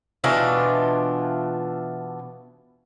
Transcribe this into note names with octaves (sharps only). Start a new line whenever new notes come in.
B2 E3 D4 F4